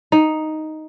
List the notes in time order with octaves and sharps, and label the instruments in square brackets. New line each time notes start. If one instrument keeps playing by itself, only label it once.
[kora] D#4